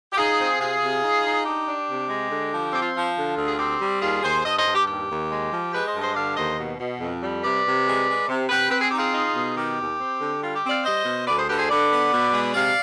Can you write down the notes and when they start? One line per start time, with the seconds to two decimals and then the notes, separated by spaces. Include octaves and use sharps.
0.12 G4
0.17 D#4 F4 G#4
0.39 C4
0.60 C3 F4 G#4
0.81 C3
1.02 D#4
1.24 D#4
1.45 D4 G4
1.67 D4
1.88 C3
2.09 G#3
2.30 D3
2.52 F3
2.73 C4 G4
2.81 F4
2.94 F3 F4
3.17 D3
3.37 D2
3.47 G#4
3.59 C4 G4
3.81 G3
4.01 D#2 F4 G#4
4.23 D#2 G#4 C5
4.44 G2 C5 D#5
4.58 C5 D#5
4.65 G2
4.73 G4
4.87 D#2 G4
5.09 D#2
5.30 G#3
5.51 F3
5.72 G#3 G4 B4
5.86 C5 D#5
5.94 G2
6.01 C5 D#5
6.14 D3 D5 F5
6.36 D#2 C5 D#5
6.58 B2
6.79 B2
7.00 F2
7.22 G3
7.42 C3 B4 D5
7.64 C3
7.85 G#3
8.07 G#3
8.28 C3
8.49 C3 G4 B4
8.71 C4 B4
8.79 G#4
8.89 D#4 G4
8.97 F4 G#4
9.14 D#4
9.35 B2
9.56 D#3 G4
9.78 D#2
9.99 C4
10.19 D3
10.41 G3 F4
10.55 G4
10.63 C4
10.69 D5 F5
10.84 G3 C5 D#5
11.05 B2
11.26 D2 B4 D5
11.37 G#4 C5
11.48 D3 G4 B4
11.58 G#4 C5
11.69 D3 B4 D5
11.90 B3
12.12 B2
12.33 G#3
12.54 C3 D5 F5